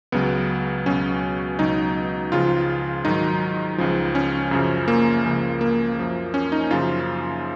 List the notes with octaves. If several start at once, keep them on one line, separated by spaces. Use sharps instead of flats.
C#2 C#3 F#3 B3
C#2 B2 F#3 C#4
C#2 B2 F#3 D#4
C#2 C#3 F3 F4
G#2 D#3 F#3 D#4
C#2 C#3 F3
C#4
F#2 C#3 F3
A#3
C#2 C#3 F3
A#3
F#2 F3
C#4
D#4
F#2 C#3 F3 F4